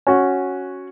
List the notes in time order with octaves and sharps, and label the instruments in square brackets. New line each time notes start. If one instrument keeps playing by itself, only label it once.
[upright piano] C#4 F#4